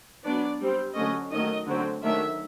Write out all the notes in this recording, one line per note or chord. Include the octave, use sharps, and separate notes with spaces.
F#3 B3 D4 D5
G3 C4
D3 F#3 A3 C#4 D#5
D#3 F#3 A3 D#5
D3 F#3 A3 C4
D#3 F#3 A3 D4 E5